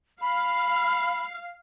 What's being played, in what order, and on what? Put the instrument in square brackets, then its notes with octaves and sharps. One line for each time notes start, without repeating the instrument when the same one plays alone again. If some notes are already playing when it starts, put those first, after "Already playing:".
[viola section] F5 [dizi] B5